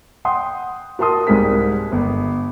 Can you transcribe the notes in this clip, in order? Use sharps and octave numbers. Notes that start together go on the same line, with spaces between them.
F#5 G5 C6 D#6
F#4 A#4 A5 C6 D#6
C2 G#2 G3 G#4 A#4 B6
G1